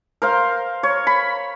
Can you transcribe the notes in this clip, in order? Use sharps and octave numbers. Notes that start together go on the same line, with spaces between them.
A#4 C5 F5
C#5
B5